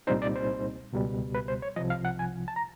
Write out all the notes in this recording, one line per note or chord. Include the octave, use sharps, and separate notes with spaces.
C2 A#2 G3 C4 D#4 C5
D5
C5
C#2 B2 G3
B4
C5
C#5
C2 C3 F3 D#5
F5
F#5
G#5
A5
A#5